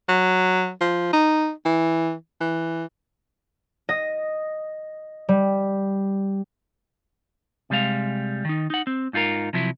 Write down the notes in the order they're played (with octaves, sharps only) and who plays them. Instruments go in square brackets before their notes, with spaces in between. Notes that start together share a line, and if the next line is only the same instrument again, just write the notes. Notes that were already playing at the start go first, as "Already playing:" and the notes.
[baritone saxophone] F#3
F3
D#4
E3
E3
[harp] D#5
G3
[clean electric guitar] C3 G3 G#3 F5
D#3 D#4
D#4 F#5
C4
G#2 D#4 F4 G#4 A#4
C3 F3 F#3 E4